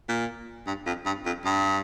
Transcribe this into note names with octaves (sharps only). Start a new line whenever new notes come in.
A#2
G2
F2
G2
F2
G2